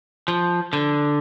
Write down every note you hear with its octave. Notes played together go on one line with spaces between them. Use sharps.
F3
D3